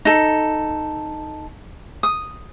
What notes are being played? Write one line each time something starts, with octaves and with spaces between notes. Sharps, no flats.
D#4 A4
D#6